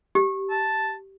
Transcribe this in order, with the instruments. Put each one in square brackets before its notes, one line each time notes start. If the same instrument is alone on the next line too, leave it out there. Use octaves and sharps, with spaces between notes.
[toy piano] G4
[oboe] A5